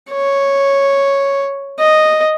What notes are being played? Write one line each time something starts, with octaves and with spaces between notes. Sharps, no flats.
C#5
D#5